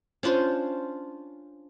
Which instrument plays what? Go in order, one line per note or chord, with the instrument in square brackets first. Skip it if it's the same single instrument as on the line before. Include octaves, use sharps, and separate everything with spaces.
[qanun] C#4 D4 F4 C5